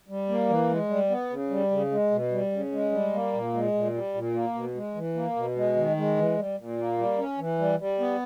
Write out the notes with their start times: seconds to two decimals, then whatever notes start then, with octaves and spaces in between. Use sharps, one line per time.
0.08 G3
0.29 A#3
0.49 E3
0.70 G#3
0.89 G3
1.10 B3
1.30 C#3
1.50 G3
1.71 C#3
1.91 G#3
2.11 B2
2.31 G3
2.52 C#3
2.72 G#3
2.92 G3
3.13 A#3
3.33 A#2
3.54 G#3
3.74 A#2
3.94 G3
4.14 A#2
4.34 A#3
4.54 B2
4.75 G#3
4.95 E3
5.15 A#3
5.36 B2
5.56 G#3
5.76 D#3
5.97 G#3
6.17 E3
6.37 G3
6.57 A#2
6.78 A#3
6.98 G3
7.18 C#4
7.38 E3
7.59 G3
7.79 G3
8.00 B3